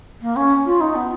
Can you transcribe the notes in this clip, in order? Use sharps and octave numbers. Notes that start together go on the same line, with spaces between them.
A#3
C#4
F4
D#4
B3